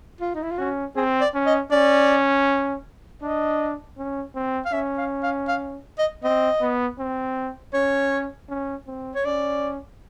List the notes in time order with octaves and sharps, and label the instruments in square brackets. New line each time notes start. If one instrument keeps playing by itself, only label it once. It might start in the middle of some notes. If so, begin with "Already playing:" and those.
[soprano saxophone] F4
D#4
E4
F4
[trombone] C#4 [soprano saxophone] F#4
[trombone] C4 [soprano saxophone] G#4
[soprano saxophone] D5
[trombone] C#4
[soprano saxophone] D#5
[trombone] C#4 [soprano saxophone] D5
[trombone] D4 [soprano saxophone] D#5
[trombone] C#4
C4
[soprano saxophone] F5
[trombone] C#4 [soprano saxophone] E5
[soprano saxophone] F5
F5
F5
D#5
[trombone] C4 [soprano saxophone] D#5
[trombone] B3
C4
[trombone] C#4 [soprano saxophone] C#5
[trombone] C#4
C4
[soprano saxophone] C#5
[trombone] C#4 [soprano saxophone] D5